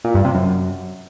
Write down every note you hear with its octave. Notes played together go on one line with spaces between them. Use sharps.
A#2
G2
C3
F#2